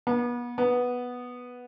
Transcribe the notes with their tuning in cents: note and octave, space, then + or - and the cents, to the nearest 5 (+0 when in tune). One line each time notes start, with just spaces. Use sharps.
B3 -35
B3 -5